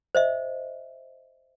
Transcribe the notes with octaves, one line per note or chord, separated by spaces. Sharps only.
C5 D#5 E5